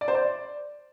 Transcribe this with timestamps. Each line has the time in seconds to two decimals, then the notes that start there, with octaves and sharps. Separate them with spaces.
0.01 D5
0.08 C5
0.15 D5